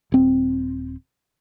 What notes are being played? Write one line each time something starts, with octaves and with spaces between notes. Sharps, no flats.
D#1 C4